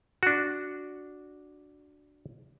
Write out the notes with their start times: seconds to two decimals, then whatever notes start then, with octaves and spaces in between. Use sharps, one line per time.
0.23 D4 F#4